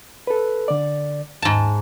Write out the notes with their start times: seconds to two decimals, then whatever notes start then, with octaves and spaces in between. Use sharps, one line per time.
0.27 A4 B4
0.68 D3 D5
1.42 D#2 G#2 A5